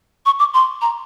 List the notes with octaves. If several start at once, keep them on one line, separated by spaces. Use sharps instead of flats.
C#6
D6
C6
A#5